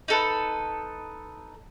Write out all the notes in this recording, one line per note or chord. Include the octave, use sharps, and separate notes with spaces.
D#4 A4 B4